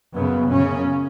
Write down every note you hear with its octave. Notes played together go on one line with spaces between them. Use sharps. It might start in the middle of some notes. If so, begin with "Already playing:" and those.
F#2 C#3 B3
F#2 C#3 C#4